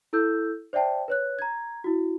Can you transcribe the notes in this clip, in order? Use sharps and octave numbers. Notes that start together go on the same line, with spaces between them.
E4 A4 E6 G6
C5 D5 E5 G5 A5
B4 C#5 F#6
A#5 G#6
E4 F#4